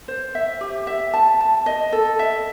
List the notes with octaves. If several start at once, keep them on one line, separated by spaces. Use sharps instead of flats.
C5
E5
G4
E5
A5
A5
D#5
A4
E5